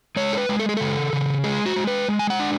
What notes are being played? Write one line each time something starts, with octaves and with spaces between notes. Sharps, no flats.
G#3 C#5
A4
B4
G#3
A4
G#4
C#3 A4
C#3
G#3 G#4
F#4
G#3
B4
G#3
G#5
F#5
D4